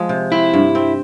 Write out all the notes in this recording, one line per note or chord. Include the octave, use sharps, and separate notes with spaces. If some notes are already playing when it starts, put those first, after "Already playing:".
Already playing: F3 G#3
C3
C4 E4
G2
C4